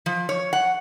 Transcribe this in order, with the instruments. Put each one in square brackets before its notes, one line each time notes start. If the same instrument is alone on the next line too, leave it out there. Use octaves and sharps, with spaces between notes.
[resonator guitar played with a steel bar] F3
C#5
F#5